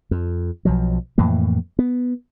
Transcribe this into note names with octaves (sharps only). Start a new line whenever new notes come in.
F2
B1 F3 F#3
F2 A2 E3 A#3
B3